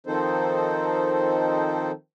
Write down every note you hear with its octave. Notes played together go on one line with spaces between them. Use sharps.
D#3 F3 C4 D#4 A4 C5